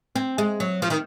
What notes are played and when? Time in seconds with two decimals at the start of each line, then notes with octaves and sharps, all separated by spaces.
0.16 C4
0.38 G#3
0.60 F#3
0.82 F3
0.90 D#3